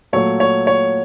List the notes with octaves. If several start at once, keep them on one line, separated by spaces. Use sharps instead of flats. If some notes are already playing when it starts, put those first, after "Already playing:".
A#2 F#3 A3 C#5
C#5
C#5